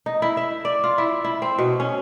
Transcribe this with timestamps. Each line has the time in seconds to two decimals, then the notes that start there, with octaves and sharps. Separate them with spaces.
0.06 D#4
0.22 E4
0.37 E5
0.65 D5
0.84 F4
0.98 E4
1.24 E4
1.42 C4
1.58 B2
1.80 C#4